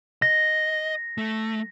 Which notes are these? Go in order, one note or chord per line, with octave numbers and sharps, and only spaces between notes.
D#5 A#6
A3